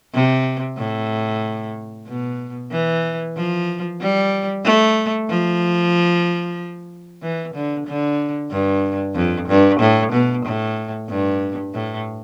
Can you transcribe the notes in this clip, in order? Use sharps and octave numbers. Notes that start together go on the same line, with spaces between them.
C3
A2
B2
E3
F3
G3
A3
F3
E3
D3
D3
G2
F2
G2
A2
B2
A2
G2
A2